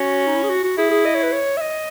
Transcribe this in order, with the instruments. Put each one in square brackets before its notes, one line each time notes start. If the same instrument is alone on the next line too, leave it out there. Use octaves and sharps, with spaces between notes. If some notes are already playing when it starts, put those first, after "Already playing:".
Already playing: [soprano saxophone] C#4 [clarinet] F#4
[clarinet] D#4
E4
G#4
F#4
F#4
[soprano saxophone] E4 [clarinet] G#4
[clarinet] G#4
D#5
C#5
B4
C#5
E5
D#5